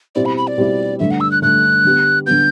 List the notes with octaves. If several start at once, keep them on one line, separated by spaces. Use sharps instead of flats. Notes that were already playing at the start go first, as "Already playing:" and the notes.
B2 G3 C4 E4 G4 D5
B5
B5
D5
B2 G3 C4 E4 G4
G2 D3 A3 E5
F#5
E6
F#6
G2 D3 A3 F#6
D3 G3 B3
D3 G3 B3 G6